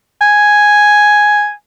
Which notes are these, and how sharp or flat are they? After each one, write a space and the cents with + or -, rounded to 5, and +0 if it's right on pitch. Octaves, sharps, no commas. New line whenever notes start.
G#5 +0